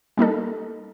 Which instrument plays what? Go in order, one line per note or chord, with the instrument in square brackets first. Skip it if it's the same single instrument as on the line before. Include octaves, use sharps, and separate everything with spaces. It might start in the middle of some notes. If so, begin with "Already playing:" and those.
[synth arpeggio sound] G3 A#3 D#4 A4